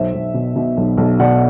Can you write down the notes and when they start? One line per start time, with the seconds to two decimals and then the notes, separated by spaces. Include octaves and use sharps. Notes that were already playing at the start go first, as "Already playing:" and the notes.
Already playing: B1 C5 E5
0.14 B1
0.34 B2
0.56 B2
0.77 B1
0.98 B1
1.19 B2 D5 F#5